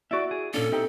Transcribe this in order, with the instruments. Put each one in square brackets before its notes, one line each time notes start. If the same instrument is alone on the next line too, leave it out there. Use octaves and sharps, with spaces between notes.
[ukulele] E4 F#4 [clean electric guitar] D5 E5
[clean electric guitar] G#4
[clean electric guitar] A#2 C#4 F4 [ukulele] D4 [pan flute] A4
[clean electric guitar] C4 [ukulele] D#4 E4 G4